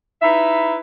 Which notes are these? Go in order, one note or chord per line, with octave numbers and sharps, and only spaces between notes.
D#4 E4 B4 E5